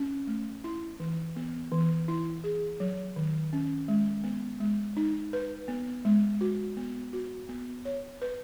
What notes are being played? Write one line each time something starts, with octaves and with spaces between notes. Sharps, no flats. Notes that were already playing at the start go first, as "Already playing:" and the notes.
Already playing: C#4
A3
E4
E3
B3
E3
E4
G#4
F#3
D#3
C#4
G#3
B3
G#3
D#4
B4
B3
G#3
F#4
B3
F#4
B3
C#5
B4